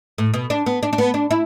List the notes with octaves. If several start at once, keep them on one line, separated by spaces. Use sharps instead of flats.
A2
B2
D4
B3
D4
D4
B3
D4
E4